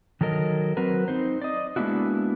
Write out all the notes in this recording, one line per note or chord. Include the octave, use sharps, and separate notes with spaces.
D#3 F#3 A4 A#4 D#5
F#3 C4 F#4 A#4 B4
C4 D#4 C5
D5 D#5
G#3 A#3 B3 D4 E4 F#4